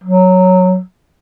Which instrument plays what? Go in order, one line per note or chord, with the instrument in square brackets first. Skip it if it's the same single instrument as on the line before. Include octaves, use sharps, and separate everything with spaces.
[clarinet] F#3